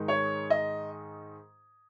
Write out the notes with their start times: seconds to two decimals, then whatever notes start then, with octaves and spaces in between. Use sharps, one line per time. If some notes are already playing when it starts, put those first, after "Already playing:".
Already playing: G#2 D#3 G#3 D#4
0.08 C#5
0.50 D#5